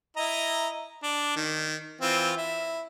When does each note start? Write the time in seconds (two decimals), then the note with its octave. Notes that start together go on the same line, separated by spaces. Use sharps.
0.17 E4 D#5 A#5
1.03 D4
1.36 D#3
2.01 E3 C4 F4
2.37 E4